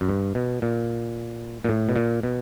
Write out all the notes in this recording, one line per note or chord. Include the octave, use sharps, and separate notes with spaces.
F#2
G2
B2
A#2
A#2
A2
B2
A#2
B2